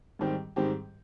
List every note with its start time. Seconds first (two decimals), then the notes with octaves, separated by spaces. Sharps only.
0.19 G#2 D#3 G3 C4 G4
0.56 G#2 D#3 G3 C4 G4